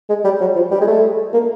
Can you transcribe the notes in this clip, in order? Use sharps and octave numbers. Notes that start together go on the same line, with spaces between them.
G#3
G3
F#3
F3
G3
G#3
A3
A#3